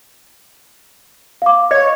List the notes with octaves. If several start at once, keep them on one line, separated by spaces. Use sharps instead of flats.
F5 D6
C#5 D#5